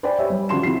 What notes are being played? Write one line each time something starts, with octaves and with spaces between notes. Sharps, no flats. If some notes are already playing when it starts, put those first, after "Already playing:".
B4 C5 D5 G5 G#5 B5
G4 C#5 E5
G3
C#3 F3 F#4 C6 E7
C3 E4 C7